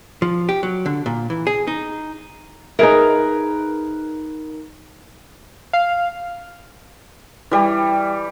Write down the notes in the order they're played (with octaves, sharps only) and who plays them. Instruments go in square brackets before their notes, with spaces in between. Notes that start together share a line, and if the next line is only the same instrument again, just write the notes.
[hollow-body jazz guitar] F3
G4
F#3
D3
A#2
E3
G#4
D#4
[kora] D#4 G#4 E5 [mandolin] A#4 B4
[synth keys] F5
[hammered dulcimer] E3 G3